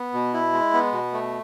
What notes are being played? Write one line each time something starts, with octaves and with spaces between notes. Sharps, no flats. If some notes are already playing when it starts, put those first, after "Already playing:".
Already playing: B3
B2
E4
G#3
B3
B2
A3